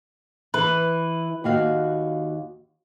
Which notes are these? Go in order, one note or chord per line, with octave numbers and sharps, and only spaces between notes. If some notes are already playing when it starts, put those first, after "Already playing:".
E3 B4
D#2 F#4 F5